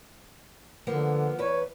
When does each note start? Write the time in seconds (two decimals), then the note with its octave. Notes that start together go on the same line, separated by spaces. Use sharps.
0.87 D3 F3 A#3 B3
1.39 E2 B4 C#5